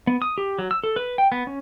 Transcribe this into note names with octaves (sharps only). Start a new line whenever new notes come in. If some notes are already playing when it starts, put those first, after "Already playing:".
B3
D#6
G4
F#3
E6
A4
B4
G5
B3
C#4